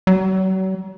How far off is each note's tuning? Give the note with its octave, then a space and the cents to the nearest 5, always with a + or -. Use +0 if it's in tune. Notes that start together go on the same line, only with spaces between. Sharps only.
F#3 +40